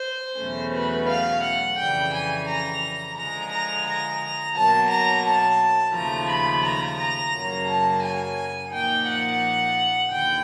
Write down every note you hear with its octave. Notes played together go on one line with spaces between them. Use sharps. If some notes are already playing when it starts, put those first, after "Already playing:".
Already playing: C5
E2 B2 F#3 A3 C#4
B4
F5
F#5
F2 C#3 E3 G3 G5
G#5
A#5
D3 F3 G#3 A#5
A#5
A#5
B2 F#3 A#3 A5
A#5
A5
D#2 C#3 F3 A3 A#5
B5
A#5
A#5
F#2 C#3 F#3 A#3
A5
G#5
A#2 F3 A#3 D#4 G5
F#5
D#2 D3 G5